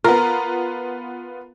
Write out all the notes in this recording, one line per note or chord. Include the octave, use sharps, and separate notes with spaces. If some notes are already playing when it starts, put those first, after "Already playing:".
B3 F4 A#4